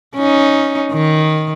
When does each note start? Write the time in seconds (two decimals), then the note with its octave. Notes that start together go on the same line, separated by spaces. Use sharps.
0.16 C#4 D#4
0.93 D#3